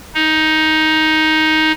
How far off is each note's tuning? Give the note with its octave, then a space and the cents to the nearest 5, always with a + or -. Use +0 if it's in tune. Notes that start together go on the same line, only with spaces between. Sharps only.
D#4 +10